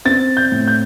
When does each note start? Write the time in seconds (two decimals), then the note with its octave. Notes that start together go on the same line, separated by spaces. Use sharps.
0.05 C4 A6
0.37 G6
0.52 A2
0.68 G6